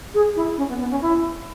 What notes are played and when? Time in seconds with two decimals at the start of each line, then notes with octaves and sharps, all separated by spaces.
0.14 G#4
0.35 E4
0.57 C#4
0.68 B3
0.79 B3
0.90 C#4
1.01 E4